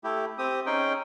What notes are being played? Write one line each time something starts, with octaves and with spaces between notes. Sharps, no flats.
A3 E4 G4
C4 G4 D#6
C#4 D#4 G#4 G5